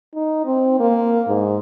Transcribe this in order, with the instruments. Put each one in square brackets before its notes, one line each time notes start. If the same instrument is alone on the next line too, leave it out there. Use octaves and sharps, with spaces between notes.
[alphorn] D#4
C4
A#3
G#2